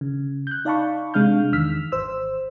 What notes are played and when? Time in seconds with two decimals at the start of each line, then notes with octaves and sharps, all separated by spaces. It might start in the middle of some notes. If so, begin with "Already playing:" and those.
0.01 C#3
0.47 F#6 G6
0.65 D#4 D5 F5 A5 B5 C#6
1.14 C3 G#3 D4 F5 F6 G6
1.53 E2 D#3 E6 F6 B6
1.92 G#1 C5 E6